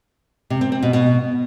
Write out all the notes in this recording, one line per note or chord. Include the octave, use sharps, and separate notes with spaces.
C3
C4
C4
B2
B2